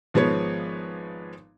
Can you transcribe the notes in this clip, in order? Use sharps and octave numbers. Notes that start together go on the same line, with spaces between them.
G#1 F3 G#3 B3 C#5